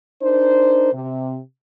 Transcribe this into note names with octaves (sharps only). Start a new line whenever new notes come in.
D4 D#4 A#4 C5
C3